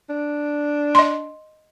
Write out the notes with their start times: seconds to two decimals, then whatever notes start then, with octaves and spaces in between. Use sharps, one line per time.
0.10 D4
0.95 D#5 C6